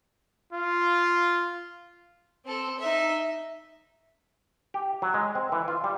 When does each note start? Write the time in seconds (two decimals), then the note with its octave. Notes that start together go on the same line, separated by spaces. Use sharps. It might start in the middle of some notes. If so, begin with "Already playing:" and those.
0.53 F4
2.45 C4 A4
2.79 D#4 E5
4.74 G4
5.02 F#3
5.14 G#3
5.35 C4
5.52 E3
5.68 F4
5.84 G3